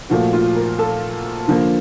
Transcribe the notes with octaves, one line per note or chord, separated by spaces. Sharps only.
A#2 F3 A3 F#4
F4
A#4
A4
D3 F3 A#3